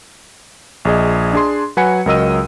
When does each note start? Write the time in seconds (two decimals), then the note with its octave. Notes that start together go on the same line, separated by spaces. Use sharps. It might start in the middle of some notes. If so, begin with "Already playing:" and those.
0.85 A#1 G#4 D#5
1.33 D4 G#4 C6
1.77 F#3 B4 F#5 G#5 B5 C#7
2.06 C#2 F#3 A#4 D#5 E6 D#7